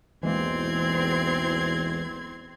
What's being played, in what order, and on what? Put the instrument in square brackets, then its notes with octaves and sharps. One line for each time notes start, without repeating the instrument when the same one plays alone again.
[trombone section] B1 E2 [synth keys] E3 G#3 A#3 [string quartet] C4 C6 G#6